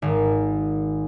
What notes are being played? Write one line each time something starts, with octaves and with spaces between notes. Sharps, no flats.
G#1